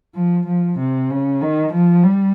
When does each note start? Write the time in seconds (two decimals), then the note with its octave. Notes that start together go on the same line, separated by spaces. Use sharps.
0.15 F3
0.46 F3
0.79 C3
1.10 C#3
1.41 D#3
1.73 F3
2.04 G3